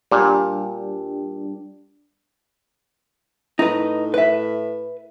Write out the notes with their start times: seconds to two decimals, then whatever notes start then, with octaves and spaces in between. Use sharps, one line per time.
0.11 A#2 G3 D4 G4
3.59 A2 D#4 B4
4.14 B4 E5